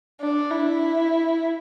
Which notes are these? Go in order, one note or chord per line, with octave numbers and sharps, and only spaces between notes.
D4
E4